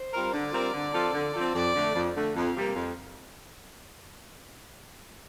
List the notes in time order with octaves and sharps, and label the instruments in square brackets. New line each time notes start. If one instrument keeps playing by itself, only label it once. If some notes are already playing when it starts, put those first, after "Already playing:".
Already playing: [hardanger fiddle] C5
[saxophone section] G3 C4 F4 A#4
[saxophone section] D3 [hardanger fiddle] D5
[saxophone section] G3 C4 F4 A#4
D3
F3 C4 F4 A4
D3
F3 C4 F4 A4
[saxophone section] F2 [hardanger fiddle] D5
[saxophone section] D3 A3
F2
D3 A3
[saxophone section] F2 [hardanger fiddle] F5
[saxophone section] C3 G3 A#3
F2